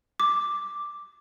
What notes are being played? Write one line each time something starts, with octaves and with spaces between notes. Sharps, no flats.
D6